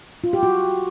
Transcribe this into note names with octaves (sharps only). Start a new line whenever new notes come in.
F4
G4
F#4